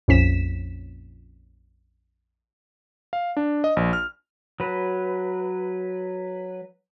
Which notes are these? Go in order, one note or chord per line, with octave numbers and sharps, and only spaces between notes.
A#1 F2 C#4 B6 E7
F5
D4
D#5
A#1
F6
F#3 B4